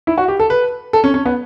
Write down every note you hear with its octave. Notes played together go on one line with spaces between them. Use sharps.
E4
F#4
G4
A4
B4
A4
C#4
C#4
B3